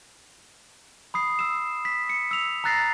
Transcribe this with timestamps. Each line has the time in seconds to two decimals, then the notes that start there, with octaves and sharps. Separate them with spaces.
1.14 B5 D#6 C7
1.39 E6 E7
1.85 B6
2.09 C#7
2.31 E6 F7
2.64 A#5 E6 F#6 A6 A#6 C7